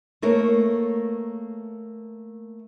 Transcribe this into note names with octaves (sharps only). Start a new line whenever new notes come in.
A3 A#3 A#4 B4 C#5